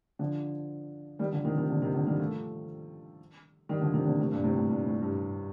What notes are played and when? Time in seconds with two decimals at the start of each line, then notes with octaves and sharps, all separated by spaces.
0.19 D3 F3
1.19 D#3 G3
1.32 D3 F3
1.45 C3 D#3
1.57 C3 D#3
1.69 A#2 D3
1.82 C3 D#3
1.94 D3 F3
2.06 D#3 G3
2.19 F3 A3
3.69 D#3 G3
3.81 D3 F3
3.94 C3 D#3
4.06 A#2 D3
4.19 A2 C3
4.31 G2 A#2
4.44 A2 C3
4.57 A2
4.69 G2 A#2
4.86 A2
5.02 G2